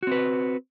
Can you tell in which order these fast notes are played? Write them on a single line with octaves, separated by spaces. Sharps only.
F#4 C4 B4